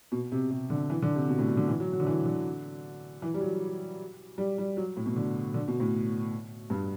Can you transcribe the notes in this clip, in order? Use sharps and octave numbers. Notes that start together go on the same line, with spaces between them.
B2
C3
C3
D3
E3
D3
C3
B2
A2
B2
D3
E3
F#3
F#3
D3
E3
D3
E3
G3
F#3
G3
G3
F#3
A2
B2
D3
D3
B2
A2
G2